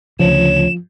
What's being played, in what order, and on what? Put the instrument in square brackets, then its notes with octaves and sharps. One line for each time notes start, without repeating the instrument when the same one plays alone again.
[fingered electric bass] D2 C#3 [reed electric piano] F3 F4 [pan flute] C#5 [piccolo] E7